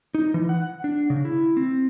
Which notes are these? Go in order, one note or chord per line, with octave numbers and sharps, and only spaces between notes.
D#4
E3
F#5
D4
C#3
E4
C4